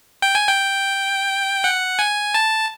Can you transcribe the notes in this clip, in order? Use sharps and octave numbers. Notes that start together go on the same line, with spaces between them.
G5
G#5
G5
F#5
G#5
A5